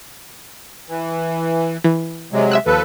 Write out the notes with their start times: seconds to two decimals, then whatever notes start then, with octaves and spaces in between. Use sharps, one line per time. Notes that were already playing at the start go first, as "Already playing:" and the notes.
0.89 E3
1.84 E3
2.32 C3 F#3 G#3
2.52 E5 E6 F#6
2.66 D#2 F3 A4 B4